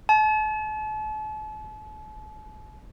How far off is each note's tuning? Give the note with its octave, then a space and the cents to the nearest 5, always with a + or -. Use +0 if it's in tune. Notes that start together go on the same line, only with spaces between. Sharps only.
A5 -40